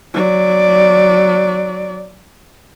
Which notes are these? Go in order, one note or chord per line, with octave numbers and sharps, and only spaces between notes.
F#3 D5